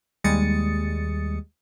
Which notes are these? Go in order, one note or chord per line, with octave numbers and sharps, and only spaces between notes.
D#2 G3 G#3 D#6 A6 C#7